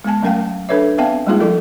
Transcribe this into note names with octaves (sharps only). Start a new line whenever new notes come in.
G#3 B3 G#5 A5
F#3 A3 C#4 A#4 F5 G5
D4 A4 B4 C#5 E5
B3 C4 E5 F5 G5 A5
G3 G#3 A#3 D#4 F4 G#4
F3 E4 A4 A#4